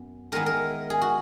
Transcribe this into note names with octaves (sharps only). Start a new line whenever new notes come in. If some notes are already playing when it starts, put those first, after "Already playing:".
Already playing: F#2 B3
D#3 G#3 B3 E4 A#4
A#4
G#4
F#4